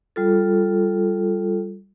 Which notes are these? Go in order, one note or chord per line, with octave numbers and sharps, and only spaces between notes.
G3 F4 A4